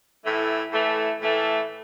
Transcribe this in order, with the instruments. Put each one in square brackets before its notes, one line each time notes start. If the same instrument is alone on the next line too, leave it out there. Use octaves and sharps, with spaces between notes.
[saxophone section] A2 E3 A3
A2 E3 A3
A2 E3 A3